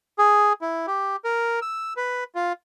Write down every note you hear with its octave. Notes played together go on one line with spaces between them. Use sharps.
G#4
E4
G4
A#4
E6
B4
F4